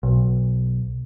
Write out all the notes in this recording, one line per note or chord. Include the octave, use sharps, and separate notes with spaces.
B1